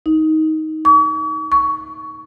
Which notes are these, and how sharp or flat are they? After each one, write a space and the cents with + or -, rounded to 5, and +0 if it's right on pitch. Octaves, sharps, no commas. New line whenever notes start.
D#4 +15
C#6 +45
C#6 +15